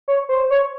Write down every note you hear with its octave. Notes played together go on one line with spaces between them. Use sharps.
C#5
C5
C#5